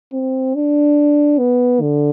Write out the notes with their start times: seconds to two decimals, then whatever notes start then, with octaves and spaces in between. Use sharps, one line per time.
0.13 C4
0.55 D4
1.39 B3
1.81 D3